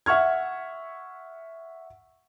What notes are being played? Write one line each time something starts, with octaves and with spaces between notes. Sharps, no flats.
E5 F#5 C#6 F6 G#6